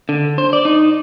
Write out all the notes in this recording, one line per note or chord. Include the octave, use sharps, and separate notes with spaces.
D3
C5
D5
D#4